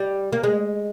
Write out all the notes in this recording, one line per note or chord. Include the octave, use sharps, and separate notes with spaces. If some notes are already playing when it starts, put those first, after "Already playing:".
Already playing: G3
A#3
G#3